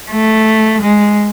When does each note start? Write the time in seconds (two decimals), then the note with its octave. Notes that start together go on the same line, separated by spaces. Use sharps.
0.11 A3
0.82 G#3